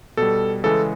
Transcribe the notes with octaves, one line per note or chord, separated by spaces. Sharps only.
B2 G3 A4
C#3 E3 G#3 A4